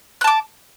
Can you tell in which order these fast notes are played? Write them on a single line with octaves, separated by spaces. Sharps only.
F#6 A5 D6